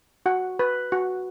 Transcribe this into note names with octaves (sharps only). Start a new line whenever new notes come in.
F#4 F#5
B4
F#4